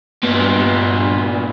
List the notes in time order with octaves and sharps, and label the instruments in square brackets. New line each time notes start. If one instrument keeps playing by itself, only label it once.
[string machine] G2 [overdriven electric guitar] A#2 B3